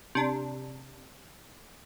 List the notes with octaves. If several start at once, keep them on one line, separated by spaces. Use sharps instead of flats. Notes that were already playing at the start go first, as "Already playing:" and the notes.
C3 D4